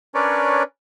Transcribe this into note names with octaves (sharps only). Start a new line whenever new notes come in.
C#4 D4 A#4 B4 C#5 D5